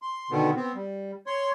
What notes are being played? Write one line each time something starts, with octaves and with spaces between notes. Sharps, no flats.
C6
B2 D3 D#3 B3
B3 C4
G3
C#5 C6